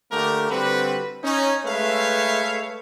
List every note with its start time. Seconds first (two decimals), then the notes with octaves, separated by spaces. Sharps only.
0.12 D3 A3 A#3 G4 A#4
0.51 D3 G3 C4 F#4 B4
1.24 C#4 D#4
1.66 G#3 A3 B4 C#5 E5 F5